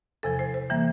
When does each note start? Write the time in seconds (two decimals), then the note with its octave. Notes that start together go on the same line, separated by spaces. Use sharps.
0.23 E2 C3 F3 A4
0.39 C5
0.54 C5
0.70 E3 G3 A#3 E5